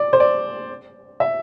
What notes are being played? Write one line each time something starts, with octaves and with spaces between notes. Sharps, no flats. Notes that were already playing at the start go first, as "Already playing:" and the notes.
Already playing: D5
C5
D5
E5